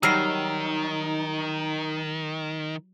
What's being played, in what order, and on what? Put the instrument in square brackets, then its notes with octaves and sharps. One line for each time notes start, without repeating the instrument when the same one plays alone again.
[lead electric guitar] D#3 [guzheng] F#3 G3 [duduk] D#4 [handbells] E6 F6 C7